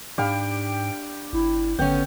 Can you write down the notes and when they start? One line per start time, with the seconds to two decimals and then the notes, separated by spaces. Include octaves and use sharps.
0.18 G#2 D4 G4 F5 B5 D7
1.33 G1 E4
1.79 G#1 D3 B3 C#4 G5